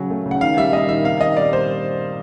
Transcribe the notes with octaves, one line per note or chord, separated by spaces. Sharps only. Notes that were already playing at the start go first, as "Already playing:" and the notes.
Already playing: C#3 F#3
A3
C#3
F#5
D#3 F5
G3 E5
A#3 D#5
D#3 E5
C3 F5
D#3 D#5
G3 D5
A#3 C5